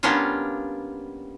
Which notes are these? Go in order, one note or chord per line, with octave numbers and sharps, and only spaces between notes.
G3 A#3 B3 C#4 D4 F4